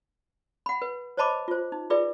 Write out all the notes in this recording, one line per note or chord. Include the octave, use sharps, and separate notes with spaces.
F#5 B5
B4
C5 C#5 D#5 A5 B5 D6
F4 C5
D#4
F4 G#4 B4 D5 E5